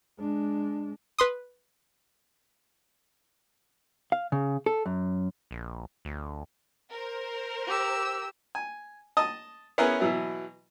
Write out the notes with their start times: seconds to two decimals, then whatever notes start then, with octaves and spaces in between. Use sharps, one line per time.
0.19 G#3 D4
1.19 B4 C6 D#6
4.12 F5
4.32 C#3
4.66 A4
4.86 F#2
5.51 A#1
6.05 D2
6.92 A#4 C5
7.67 G4 E6
8.55 G#5
9.17 D#5 A5 D#6
9.78 B3 C#4 E4 G#4 A#4 B4
10.00 B2 E3 F#3 E4